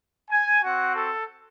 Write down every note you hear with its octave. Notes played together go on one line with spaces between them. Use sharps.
G#5
C4 F#4 F#5
A4